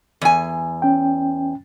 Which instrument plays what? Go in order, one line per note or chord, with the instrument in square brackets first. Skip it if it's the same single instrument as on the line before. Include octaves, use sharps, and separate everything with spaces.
[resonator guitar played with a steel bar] E2 G#5
[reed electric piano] C#4 G5